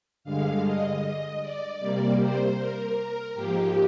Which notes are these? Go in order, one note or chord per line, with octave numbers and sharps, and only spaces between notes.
G2 D3 G#3 F5
D#5
D5
C3 G3 A#3
C5
A#4
A#4
G#2 F3 A#3 G4